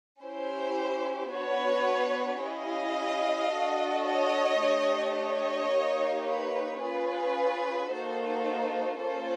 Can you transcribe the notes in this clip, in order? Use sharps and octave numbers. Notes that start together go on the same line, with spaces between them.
C#4 E4 G4 C5
B3 D4 F#4 B4 C#5
C#4 E4 G4 D#5 F5
D4 F#4 A4
C#5 D#5
A3 D4 G4
C#5 D#5
A#3 D#4 G4
B4 C#5
C#4 F4 G#4 B4
A#3 D#4 F#4 A4 C5
A#3 C#4 F4 A4 C5